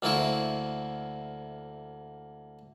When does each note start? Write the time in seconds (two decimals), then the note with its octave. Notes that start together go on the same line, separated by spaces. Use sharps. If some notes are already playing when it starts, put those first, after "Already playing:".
0.02 D2 A#3 C4 E4 C#6